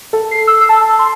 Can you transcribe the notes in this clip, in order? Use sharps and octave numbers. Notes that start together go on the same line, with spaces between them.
A4
C7
E6
A5
C6